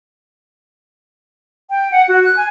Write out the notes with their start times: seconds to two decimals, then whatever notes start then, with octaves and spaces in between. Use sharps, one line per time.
1.70 G5
1.92 F#5
2.08 F#4
2.24 F#6
2.37 G#5